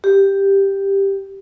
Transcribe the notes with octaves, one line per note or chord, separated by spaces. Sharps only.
G4